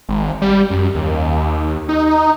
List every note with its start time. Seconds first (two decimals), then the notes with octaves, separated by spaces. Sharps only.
0.09 G#1
0.42 G3
0.70 F#2
0.95 D#2
1.89 D#4